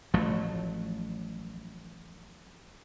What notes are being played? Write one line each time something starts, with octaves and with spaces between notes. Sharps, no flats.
A1 F3 F#3 A3